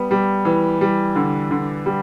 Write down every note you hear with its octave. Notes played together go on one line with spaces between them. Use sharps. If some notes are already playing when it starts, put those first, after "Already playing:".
Already playing: G3 B3
G3
E3
G3
D3
D3
G3